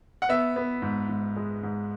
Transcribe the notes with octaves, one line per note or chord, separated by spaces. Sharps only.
F#5
B3 E5
B3
G#2
G#2
G#3
G#2